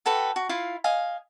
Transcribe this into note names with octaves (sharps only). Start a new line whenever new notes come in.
F#4 A4 B4 G5
F#4
E4 F4 F5
D#5 F5 G#5